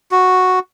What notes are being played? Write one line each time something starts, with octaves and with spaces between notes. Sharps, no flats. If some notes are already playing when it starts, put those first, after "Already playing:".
F#4